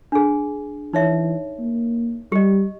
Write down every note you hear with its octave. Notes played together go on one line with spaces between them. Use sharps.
D4 G#4
E3 D#4 C#5 E5
A#3
G3 G4 D#5